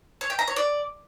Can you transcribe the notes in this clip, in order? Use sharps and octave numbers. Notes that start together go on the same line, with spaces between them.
C#5
G5
A#5
C#5
D5